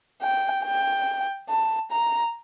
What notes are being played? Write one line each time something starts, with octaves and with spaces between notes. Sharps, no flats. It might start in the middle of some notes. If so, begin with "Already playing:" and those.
G5
G5
A5
A#5